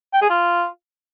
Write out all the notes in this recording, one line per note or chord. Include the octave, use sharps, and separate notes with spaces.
G5
G#4
F4